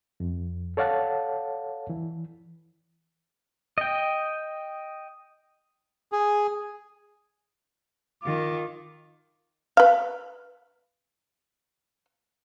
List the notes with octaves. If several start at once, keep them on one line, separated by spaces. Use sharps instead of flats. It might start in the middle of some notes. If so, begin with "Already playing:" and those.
F2
A4 C#5 D5 F5 F#5 A5
E3
D#5 G5
G#4
D#3 F4 D6
B4 F5